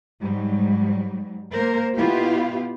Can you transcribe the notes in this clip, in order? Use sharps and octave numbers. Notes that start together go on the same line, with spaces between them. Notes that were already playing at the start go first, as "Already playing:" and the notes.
G#2 F#3 G3
A#3 A#4 C5
B2 B3 E4 F4 G4 F5